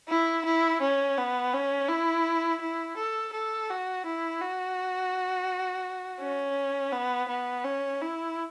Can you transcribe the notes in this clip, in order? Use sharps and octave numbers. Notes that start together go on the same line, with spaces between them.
E4
E4
C#4
B3
C#4
E4
E4
A4
A4
F#4
E4
F#4
C#4
B3
B3
C#4
E4